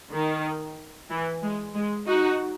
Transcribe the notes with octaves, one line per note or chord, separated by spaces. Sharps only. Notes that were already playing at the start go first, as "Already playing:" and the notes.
D#3
E3
G#3
G#3
D#4 F#4